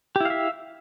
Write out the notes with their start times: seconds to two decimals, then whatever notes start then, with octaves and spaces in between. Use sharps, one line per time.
0.16 G4
0.21 E4
0.25 F5
0.30 E5